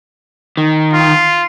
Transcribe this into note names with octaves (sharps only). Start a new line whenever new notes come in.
D#3
F4